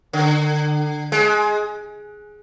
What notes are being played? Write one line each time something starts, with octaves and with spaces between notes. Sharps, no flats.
D3
G#3